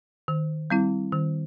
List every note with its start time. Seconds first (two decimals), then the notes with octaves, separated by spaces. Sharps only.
0.28 D#3
0.70 G3 C4 E4
1.13 D#3